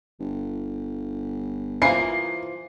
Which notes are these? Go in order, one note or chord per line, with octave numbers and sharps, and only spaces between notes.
G1
E3 F3 A#3 C7